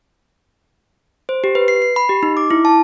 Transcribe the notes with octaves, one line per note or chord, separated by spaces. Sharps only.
C5
G4
B4
C7
C7
B5
G4
D#4
D6
E4
A5